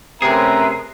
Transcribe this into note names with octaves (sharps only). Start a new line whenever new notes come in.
C3 A3 C#4 G#4 A#4 B4 E5 A#5